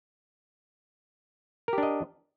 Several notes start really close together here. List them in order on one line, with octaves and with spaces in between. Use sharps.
A#4 G4 D4 D#5